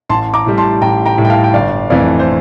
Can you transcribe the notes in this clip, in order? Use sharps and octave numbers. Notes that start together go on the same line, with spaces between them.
A1 A5 C6
A#5 D6
A2 G3
A5 C6
A1 G5 A#5
G5 A#5
A2 G3
G5
F5 A5
G5
G1 D5 F5
F2 E3 A3 D5 F5
C5